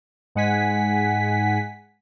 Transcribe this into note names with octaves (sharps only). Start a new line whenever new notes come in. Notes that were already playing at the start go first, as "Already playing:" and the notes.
G#2 G#3 F#5 G#5 B6